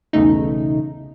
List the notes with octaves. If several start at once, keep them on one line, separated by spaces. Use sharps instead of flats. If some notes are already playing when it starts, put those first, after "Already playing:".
B1 E2 C#3 A3 D#4